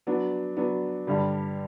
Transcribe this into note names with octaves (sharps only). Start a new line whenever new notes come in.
F#3 B3 D4
F#3 B3 D4
G2 D3 G3